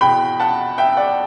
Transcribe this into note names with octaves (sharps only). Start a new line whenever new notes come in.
E2 B2 G5 B5
F#5 A5
E5 G5
D5 F#5